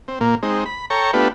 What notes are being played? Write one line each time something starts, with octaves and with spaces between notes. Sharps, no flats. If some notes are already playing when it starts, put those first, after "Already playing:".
C4
A#2 A#3
G#3 C4 D#4
B5
A4 C#5 G5 A#5 C#6
A3 B3 D4 F4 G4 B4